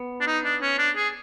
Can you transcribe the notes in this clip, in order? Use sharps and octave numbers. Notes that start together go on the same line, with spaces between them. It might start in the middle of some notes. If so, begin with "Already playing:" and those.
Already playing: B3
D4
D#4
D4
C#4
D4
G#4